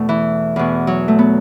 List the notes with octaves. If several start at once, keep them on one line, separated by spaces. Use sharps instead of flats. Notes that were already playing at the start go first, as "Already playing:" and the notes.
Already playing: E2 B2 A3
E3
E2 B2
F#3
A3
B3